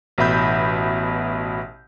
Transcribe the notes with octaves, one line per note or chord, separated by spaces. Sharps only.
A1 B2 E5 B5 G6